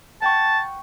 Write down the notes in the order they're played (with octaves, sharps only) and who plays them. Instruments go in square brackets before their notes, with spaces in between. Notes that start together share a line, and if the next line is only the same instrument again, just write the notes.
[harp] F#5 G5 C#6 [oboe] A5